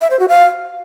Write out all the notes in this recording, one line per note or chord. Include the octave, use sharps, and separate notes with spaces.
E5
C5
F#4
F5